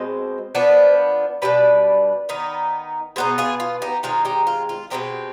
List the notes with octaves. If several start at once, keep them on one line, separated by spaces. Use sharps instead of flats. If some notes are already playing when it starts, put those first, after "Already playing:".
Already playing: B2 G#3 C4 C5 D#5
F3 B3 D4
B2 G3 D4 B4 D5
D#3 B3 D#4
B2 B3 D#4 G#4 C5
F4 G#4
F4
D#4 G4
D#3 G#3 C4 D#4 F4
D#4 G4
F4
F4
B2 G#3 C4 D#4 G4